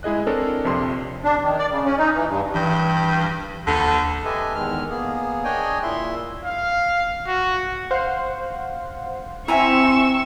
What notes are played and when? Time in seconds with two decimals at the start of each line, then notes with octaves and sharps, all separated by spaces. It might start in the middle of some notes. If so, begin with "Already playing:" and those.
0.03 G#3 E4 G#4 D#5 F#6
0.27 C4 D4 A4 A#4 C#5 D5
0.64 A#1 F2 C3 C6
1.24 D4
1.42 D#3
1.59 D5
1.71 C#3
1.85 C#4
1.98 D#4
2.15 E3
2.27 G2
2.54 G2 E3
3.67 D#2 D3
4.25 G4 A4 B4 D#5 E5 G#5
4.55 E2 D#3 G#3 F6
4.90 A#3 B3 G#4
5.44 D4 G#4 C#5 D#5 G5 G#5
5.82 A#2 E4 E5 C6
6.45 F5
7.27 F#4
7.91 C5 F5 F#5
9.48 C4 E4 E5 G#5 A#5 C#6 E6